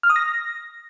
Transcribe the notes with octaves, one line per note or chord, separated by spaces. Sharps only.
F6
D#6
A#6